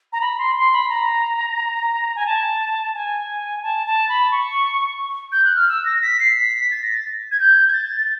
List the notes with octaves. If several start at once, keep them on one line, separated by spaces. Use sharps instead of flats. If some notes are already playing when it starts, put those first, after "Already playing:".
A#5
B5
C6
C6
B5
A#5
G#5
A5
G#5
A5
A5
B5
C#6
G6
F#6
F6
E6
A#6
B6
C7
B6
A6
A#6
A6
G#6
G6
G#6
A6